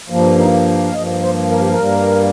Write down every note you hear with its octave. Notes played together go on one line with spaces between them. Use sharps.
G2 F3 A#3
D#4
F5
G2 F3 A#3 D#5
C5
A#4
G4
A#4
G2 G3 A#3